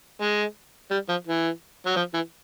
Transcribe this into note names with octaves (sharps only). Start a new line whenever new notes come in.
G#3
G3
F3
E3
F#3
F3
E3